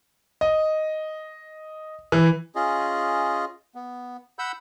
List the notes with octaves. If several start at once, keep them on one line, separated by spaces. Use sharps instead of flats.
D#5
E3
C#4 F4 G#4 D#5
B3
F#5 B5 E6 G6